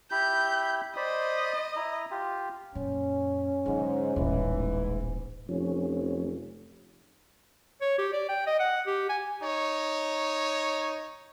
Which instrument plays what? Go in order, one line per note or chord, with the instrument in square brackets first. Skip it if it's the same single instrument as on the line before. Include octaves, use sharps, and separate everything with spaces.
[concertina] E4 G4 B5 [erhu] G6
[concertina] C5 D5 B5 [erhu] D#5
[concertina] E4 A#5
F4 G4
[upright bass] F#2 A#2 [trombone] C#4
[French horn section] G#2 [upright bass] D3 F#3
[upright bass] D#1 A1 [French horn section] G#2 E3
[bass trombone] F1 [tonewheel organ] F3 C#4
[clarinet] C#5
G4
D5
G5
D#5
F#5
G4
G#5
[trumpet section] D#4 C#5